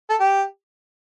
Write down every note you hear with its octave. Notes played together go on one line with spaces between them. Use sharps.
A4
G4